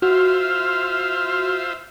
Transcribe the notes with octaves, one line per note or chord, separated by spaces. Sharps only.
F4 F#4 C5 E5 F6